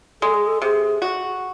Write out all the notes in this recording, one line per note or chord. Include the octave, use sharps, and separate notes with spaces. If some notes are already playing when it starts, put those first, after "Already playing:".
G#3 A4
G#4
A4
C3 G#4
F#4